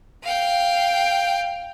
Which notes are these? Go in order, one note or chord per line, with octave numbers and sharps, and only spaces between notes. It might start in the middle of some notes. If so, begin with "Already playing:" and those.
F5 G5